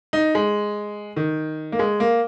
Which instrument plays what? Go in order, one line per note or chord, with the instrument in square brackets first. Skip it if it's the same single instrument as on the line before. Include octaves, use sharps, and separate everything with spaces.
[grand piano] D#4
G#3
D#3
A#3
G#3
A#3